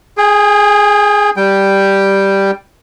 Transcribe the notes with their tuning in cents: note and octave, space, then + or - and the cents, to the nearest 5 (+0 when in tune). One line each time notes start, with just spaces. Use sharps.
G#4 +0 G5 +45
G3 +0 G5 +0